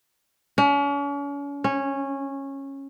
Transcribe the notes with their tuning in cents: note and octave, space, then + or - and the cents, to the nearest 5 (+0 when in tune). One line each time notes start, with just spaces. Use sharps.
C#4 +40
C#4 -15